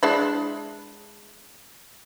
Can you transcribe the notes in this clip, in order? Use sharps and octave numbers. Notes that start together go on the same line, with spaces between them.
G#3 D4 E4